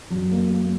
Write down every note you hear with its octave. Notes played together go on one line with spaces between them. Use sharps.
F#2
A#3
A#3